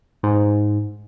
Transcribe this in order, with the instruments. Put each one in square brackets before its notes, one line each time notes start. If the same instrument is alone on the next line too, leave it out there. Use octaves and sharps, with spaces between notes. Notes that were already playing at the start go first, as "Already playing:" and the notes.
[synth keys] G#2